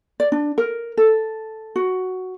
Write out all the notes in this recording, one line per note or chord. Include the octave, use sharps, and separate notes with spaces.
D5
D4
A#4
A4
F#4